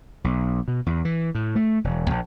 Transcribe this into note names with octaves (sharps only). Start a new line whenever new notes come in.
B1
B2
E2
E3
A2
A3
E1
A#1